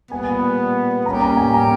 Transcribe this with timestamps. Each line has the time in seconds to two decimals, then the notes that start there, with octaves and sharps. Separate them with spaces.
0.11 A#2 G3 B3 G#5
1.06 G3 A#3 C#4 G4 A#5
1.22 A#5
1.37 G#5
1.54 A#5